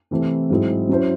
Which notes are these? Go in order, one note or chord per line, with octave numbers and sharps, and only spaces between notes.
C3 E3 A3 C4 E4
G#2 F#3 C4 E4 G#4
F#3 C#4 E4 C5